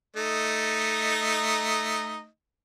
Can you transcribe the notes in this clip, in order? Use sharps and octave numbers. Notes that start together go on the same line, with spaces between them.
A3 D#4 D#5